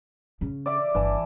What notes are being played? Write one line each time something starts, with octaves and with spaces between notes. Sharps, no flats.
C#3 C#4
D5 E5 D6
G1 E3 A5